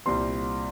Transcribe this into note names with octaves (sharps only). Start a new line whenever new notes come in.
C2 A#2 G3 C4 C6